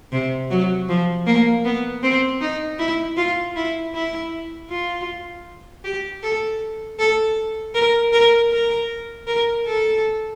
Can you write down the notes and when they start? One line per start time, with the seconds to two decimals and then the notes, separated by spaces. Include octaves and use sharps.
0.12 C3
0.50 F#3
0.88 F3
1.26 A#3
1.65 B3
2.02 C4
2.41 D#4
2.79 E4
3.17 F4
3.56 E4
3.94 E4
4.70 F4
5.84 G4
6.23 A4
6.99 A4
7.74 A#4
8.12 A#4
8.51 A#4
9.27 A#4
9.66 A4